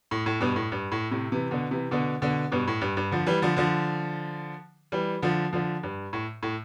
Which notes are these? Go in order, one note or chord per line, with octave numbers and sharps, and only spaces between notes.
A2
A2
G2 B2
A2
G2
A2
A2 C3
C3 E3
B2 D3
C3 E3
B2 D3
B2 D3
G2 B2
A2
G2
G2
D3 F3
E3 G3
D3 F3
D3 F3
E3 G3
D3 F3
D3 F3
G2
A2
A2